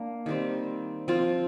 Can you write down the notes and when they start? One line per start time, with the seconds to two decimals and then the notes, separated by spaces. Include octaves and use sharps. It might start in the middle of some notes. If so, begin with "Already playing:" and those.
Already playing: A#3 D4
0.26 D#3 G3 C4
1.08 F3 C4 F4